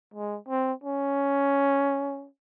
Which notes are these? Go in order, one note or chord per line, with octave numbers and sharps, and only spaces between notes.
G#3
C4
C#4